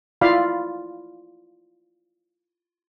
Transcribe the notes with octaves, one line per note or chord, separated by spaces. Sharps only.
E4 F4 D5 F5 B5